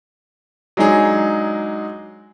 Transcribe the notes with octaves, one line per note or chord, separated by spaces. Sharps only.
F#3 G#3 D4 D#4 G#4